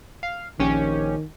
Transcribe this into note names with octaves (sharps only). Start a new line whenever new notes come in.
F5
A#1 D#3 C#4 G4